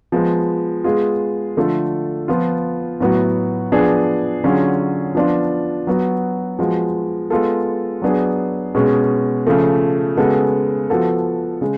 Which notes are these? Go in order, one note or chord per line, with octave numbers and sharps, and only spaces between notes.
F3 G#3 B3
G#3 B3 F4 G#4
D3 F3 A3 F4 A4
F3 B3 F4
A2 F#3 B3 F#4
F3 B3 D4 G#4
D3 F#3 C#4 F4 G#4
F3 B3 D4 F4
F#3 B3 F#4
F3 G#3 B3 F#4
G#3 B3 F4 A4
F#3 B3 D4 G#4
B2 G#3 C#4 G#4
C#3 F3 A3
C#3 G#3 B3 F#4 A4
F3 B3 F#4 A4
C#3 G#3